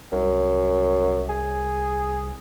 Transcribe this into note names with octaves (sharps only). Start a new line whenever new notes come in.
C2 F#2
G#4